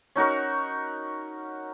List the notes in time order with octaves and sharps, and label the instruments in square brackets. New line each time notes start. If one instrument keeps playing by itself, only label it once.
[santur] C#4 D#4 F#4 A#4